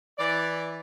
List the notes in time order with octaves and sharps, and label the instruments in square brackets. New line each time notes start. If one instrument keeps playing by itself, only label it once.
[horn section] E3 D5